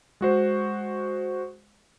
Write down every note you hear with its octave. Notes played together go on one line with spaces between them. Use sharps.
G#3 F#4 C5